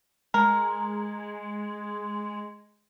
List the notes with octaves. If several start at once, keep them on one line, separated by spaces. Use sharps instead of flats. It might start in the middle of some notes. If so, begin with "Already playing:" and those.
G#3 A#4